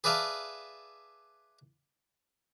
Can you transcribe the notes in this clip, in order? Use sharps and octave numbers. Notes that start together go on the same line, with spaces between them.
G#4 B4 D5 E5 F5 A5